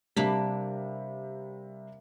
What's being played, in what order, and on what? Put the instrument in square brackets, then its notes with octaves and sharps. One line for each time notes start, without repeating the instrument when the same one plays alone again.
[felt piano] C3 G3 [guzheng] A#3 D4 B5